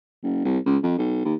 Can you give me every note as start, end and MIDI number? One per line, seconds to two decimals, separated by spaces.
0.23 0.43 30
0.45 0.58 36
0.66 0.78 37
0.83 0.98 41
0.98 1.25 35
1.25 1.35 39